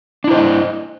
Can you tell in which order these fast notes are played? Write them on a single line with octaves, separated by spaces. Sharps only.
D4 E4 C5 D#5